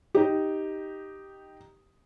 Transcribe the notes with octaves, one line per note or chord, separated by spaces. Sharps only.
D#4 G4